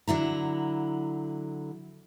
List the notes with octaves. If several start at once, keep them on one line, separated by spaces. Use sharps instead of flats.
D3 F#3 E4 A#5